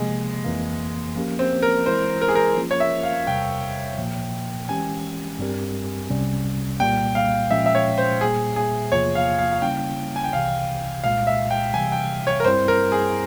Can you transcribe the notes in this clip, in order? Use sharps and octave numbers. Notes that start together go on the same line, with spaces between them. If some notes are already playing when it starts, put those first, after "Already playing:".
Already playing: C3 F3 G#3 A#3
F2 E3 A#3
F3 A#3 C#4 G4 A#4
C4
A#4
E3 G#3 E4 C5
A#4
G#4
A#4
F3 A#3 C#4 F4 A#4
C#5
E5
F5
E2 C3 G3 G5
A#2 F3 A#3
E3 G#3 C#4 G4 G#5
G2 G3 C4 G4 A#4
C2 C3 G3 C#4
C2 A#2 G3 A#3 G5
F5
A#2 F3 G#3 C#4 E5
E5
C#5
C5
A#2 G3 A#3 G#4
G#4
E2 C3 F3 A#3 F4 C#5
F5
F5
F5
C#3 G3 A#3 C#4 E4 G5
G#5
G5
C2 C3 E3 F5
C2 A#2 G#3 F5
E5
G5
C3 E3 G3 G#5
G5
C#5
A#4
G2 G3 C4 E4 C5
A#4
G#4